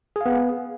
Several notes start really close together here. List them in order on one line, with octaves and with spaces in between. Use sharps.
G#4 F5 B3